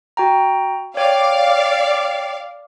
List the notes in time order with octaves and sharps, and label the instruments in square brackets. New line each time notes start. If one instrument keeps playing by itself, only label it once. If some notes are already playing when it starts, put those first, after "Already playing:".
[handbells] F#4 G5 A#5
[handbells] C#5 G5 [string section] D5 F5